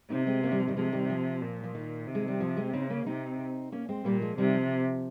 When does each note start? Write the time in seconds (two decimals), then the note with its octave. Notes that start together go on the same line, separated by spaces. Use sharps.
0.10 C3 C4 D#4
0.27 G#3 C4
0.43 A#3 C#4
0.51 D#3 G3
0.60 F3
0.67 D#3 G3
0.76 C3 F3 G#3
0.92 D#3 G3
1.10 F3
1.42 A#2
1.64 F3
1.75 D#3
2.07 C3
2.15 G#3
2.28 G3
2.40 F3
2.57 G#3 C4
2.73 C#3 C4 D#4
2.90 A#3 C#4
3.06 C3 C4 D#4
3.72 A#3 C#4
3.89 G#3 C4
4.05 A#2 G3 A#3
4.21 F3 G#3
4.38 C3 D#3 G3
4.54 F3